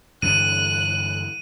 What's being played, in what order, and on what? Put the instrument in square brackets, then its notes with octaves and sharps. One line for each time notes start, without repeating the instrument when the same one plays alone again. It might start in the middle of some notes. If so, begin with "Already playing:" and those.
[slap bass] G2 D3 E3 [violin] F#6 [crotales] D#7